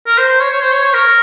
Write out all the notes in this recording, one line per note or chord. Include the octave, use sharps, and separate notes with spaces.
A#4
C5
C5
C#5
C#5
C5
C#5
C#5
A#4